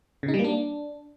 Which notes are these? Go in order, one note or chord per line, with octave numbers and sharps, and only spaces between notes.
C#3
D#4
G3
A#3
D4